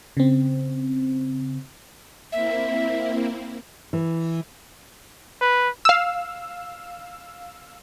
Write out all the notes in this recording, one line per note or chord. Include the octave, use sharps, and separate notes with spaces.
C#3 C4
A#3 C4 E4 E5
E3
B4
F5 E6